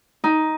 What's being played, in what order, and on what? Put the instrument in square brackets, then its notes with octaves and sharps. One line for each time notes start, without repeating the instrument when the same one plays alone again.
[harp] D#4